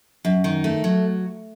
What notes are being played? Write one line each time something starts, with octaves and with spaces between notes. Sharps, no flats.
F#2
D#3
A3
F#3